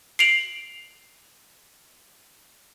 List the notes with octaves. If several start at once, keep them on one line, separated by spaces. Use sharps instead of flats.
C7 D7 F7 F#7